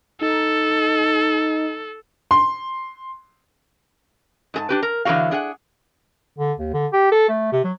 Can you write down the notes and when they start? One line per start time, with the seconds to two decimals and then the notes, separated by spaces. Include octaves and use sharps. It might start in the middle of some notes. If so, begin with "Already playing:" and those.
0.21 D#4 A4
2.31 C6
4.54 G#2 G#4 A5
4.69 D4 G4 B4
4.83 A#4
5.05 D3 E3 F#3 G3 F#4 F5
5.31 D4 G#4 F5 F#5
6.38 D3
6.59 D#2
6.73 D3
6.93 G4
7.12 A4
7.29 A3
7.52 C3
7.64 F#3